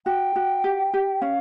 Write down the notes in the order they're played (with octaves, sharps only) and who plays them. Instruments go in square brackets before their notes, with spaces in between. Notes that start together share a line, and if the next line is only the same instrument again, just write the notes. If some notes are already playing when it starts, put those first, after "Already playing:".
[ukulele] F#4 [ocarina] G5
[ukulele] F#4
G4
G4
[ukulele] C#4 [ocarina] F5